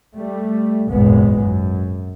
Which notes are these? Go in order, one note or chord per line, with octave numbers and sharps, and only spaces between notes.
G3 A3
G#1 C#2 F#2 A#2 G#3 B3
F#2